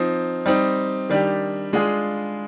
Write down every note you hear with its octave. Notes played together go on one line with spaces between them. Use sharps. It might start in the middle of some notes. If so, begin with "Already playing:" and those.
Already playing: F3 C4 D#4
G3 C4 D#4
D#3 G3 D4 G4
G#3 D4 F4 G#4